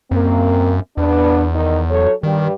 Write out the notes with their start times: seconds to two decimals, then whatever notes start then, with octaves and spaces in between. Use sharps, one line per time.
0.11 F#2 A#3 C4
0.97 E2 B3 D4
1.54 D#3 D#4
1.90 F#3 A4 C#5
2.23 G2 D#3 G3